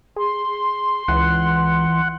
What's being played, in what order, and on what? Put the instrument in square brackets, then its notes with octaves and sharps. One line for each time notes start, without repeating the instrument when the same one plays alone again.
[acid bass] G#4 [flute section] C6
[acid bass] C#2 [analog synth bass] E3 [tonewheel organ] F#5